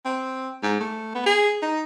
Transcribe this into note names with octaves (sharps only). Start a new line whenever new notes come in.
C4
G#2
A3
B3
G#4
D#4